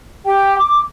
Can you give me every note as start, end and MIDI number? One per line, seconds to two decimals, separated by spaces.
0.25 0.55 67
0.25 0.55 79
0.58 0.81 86